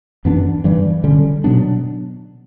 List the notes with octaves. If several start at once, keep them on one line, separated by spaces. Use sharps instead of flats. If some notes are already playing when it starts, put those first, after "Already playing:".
F#2 E3 B3 D4
G2 E3 G3
D3 G3 C#4
B2 F#3 B3 D4